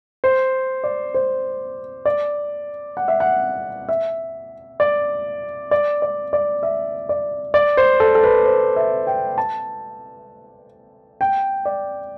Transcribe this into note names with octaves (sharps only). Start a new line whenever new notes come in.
C5
D5
C5
D5
F#5
E5
F#5
E5
D5
D5
D5
D5
E5
D5
D5
C5
A4
A4
B4
C5
E5
G5
A5
G5
D5